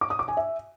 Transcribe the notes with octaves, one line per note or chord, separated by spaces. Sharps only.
D6
D#6
D6
G#5
E5